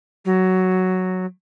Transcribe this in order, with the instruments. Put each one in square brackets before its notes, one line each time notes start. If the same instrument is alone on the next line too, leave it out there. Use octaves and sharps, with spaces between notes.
[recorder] F#3